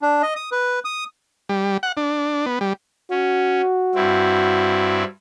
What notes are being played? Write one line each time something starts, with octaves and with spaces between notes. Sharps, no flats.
D4
D#5
D#6
B4
D#6
G3
F#5
D4
B3
G3
C#4 F#4
G2 C4 E4